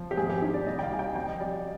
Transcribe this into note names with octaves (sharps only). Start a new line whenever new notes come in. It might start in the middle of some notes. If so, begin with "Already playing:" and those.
Already playing: F3
G4
G#1 G#4
G4
D#3
D5
C2 D#5
G5
F5
G3 G#5
G5
F2 G5
D#5
G3 D5